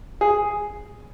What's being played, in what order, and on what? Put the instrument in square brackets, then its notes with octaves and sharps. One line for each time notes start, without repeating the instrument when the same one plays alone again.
[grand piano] G#4